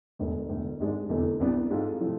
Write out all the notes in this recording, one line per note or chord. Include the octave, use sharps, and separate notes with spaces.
E1 D2 D3
E1 D2 D3
G#1 G#2 G#3 D4
F1 E2 D3 A3
C2 C3 E3 B3 D4
G#2 G#3 C4 F4 A4
C3 F3 A3